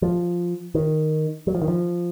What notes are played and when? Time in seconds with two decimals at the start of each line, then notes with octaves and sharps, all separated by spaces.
0.02 F3
0.75 D#3
1.47 F#3
1.55 F3
1.62 D#3
1.68 F3